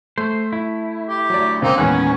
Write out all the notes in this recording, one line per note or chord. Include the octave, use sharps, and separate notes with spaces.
A3 C5
E4
G4
D2 F#3 D5
G#2 C#3 A#3 C4 D#4
E2 A#2 D#3 G#3 C#4 B4 C#5 F#5